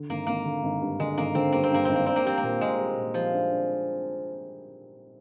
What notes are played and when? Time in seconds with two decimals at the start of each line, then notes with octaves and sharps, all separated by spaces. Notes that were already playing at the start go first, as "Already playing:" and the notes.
Already playing: D3
0.10 G#1 A#3
0.27 G#1 A#3
0.45 D3
0.63 G#1
0.81 G2
0.99 D3 G#3
1.17 G#1 A#3
1.35 D3 C4
1.52 G2 A#3
1.63 C4
1.71 G2 A#3
1.85 G#1 C4
1.96 A#3
2.06 C4 D4
2.16 A#3
2.25 G3 C4
2.38 A#3
2.43 A#2
2.61 A#2 G#3
2.79 G3
2.97 A#2
3.14 F3 G3
3.33 D4
3.51 D4